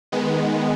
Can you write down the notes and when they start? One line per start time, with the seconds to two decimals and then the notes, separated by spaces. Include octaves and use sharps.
0.12 D#3 G#3 B3